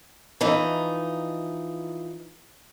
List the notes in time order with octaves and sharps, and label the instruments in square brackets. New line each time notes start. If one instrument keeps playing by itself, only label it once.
[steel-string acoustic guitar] E3 F3 D#4